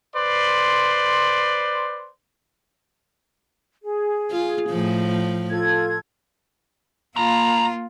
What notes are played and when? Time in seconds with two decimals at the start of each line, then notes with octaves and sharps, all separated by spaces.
0.16 B4 C5 D5 C6
3.83 G#4
4.31 F4
4.69 A2 F3
5.50 F4 A4 G#6
7.16 A#3 F4 A5 A#5